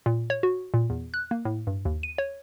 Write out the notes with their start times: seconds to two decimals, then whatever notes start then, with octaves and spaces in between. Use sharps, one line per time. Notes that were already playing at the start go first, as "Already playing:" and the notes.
0.06 A#2
0.30 C#5
0.43 F#4
0.74 A#2
0.90 E2
1.14 F#6
1.31 A#3
1.45 A2
1.67 G2
1.85 D#2
2.03 D#7
2.18 C#5